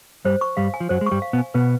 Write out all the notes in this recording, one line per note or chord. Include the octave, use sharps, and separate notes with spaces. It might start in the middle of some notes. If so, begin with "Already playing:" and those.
G2 G3 C5
C#6
G2 G3 F5
G#5
F3
F#2 F#3 C5
G#3
C#6
G2 G3
F5
B2 B3
G#5
B2 B3 B4